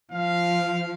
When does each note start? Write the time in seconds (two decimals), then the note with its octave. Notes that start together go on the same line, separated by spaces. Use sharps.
0.12 F3 F5